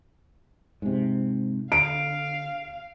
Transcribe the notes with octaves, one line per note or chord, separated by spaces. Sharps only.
G#2 C3
D3 F5 D7